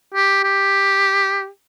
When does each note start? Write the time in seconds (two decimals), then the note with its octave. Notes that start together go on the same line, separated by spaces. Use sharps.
0.14 G4
0.43 G4